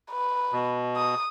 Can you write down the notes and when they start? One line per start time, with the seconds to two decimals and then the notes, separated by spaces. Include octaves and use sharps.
0.11 B4
0.53 B2
0.97 D#6